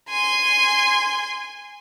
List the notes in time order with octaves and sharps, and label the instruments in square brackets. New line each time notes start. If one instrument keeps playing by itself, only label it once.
[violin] G#5 C6